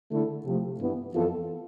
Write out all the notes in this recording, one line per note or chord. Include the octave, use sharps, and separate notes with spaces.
D3 A3 E4 A4
C3 F3 A3
G2 E3 B3
F2 E3 B3 F4 A4